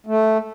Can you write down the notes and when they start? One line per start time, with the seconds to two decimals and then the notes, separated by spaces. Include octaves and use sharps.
0.07 A3